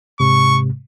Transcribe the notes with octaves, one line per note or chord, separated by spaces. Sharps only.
G#2 C3 G#3 C#6